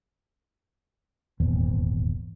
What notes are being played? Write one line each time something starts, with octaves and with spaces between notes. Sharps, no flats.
D#1 G#1 E2